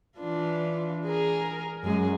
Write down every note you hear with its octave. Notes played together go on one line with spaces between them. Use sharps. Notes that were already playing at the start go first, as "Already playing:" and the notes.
E3 D4 F4
G#4 A#4
F#2 G#3 G#4